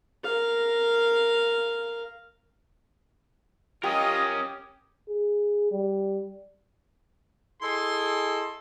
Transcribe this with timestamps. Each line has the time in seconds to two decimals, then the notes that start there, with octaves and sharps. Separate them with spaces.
0.24 A#4 F5
3.83 C#4 F4 G4 A#4 D#5 D#6
5.08 G#4
5.71 G3
7.62 E4 G#4 A4 D#5 C6